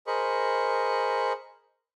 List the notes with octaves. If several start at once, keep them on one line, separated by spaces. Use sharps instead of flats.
G#4 A#4 C5 D#5 B5 C#6